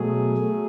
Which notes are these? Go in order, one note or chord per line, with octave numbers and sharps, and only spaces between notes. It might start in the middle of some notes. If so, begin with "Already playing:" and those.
Already playing: B2 F#3 A3 G#4
F#3 A3